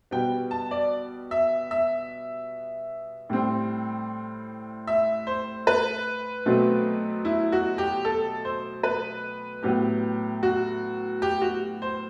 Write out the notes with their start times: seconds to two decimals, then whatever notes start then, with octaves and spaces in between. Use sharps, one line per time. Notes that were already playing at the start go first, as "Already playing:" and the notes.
0.11 B2 G3 B3 G5
0.51 A5
0.71 D5
1.31 E5
1.71 E5
3.29 A2 G3 C4
4.87 E5
5.27 C5
5.67 B4
6.46 B2 F#3 A3 C4
7.25 E4
7.52 F#4
7.78 G4
8.05 A4
8.45 C5
8.83 B4
9.63 A2 F#3 B3 G4
10.43 F#4
11.22 G4
11.41 F#4
11.82 C5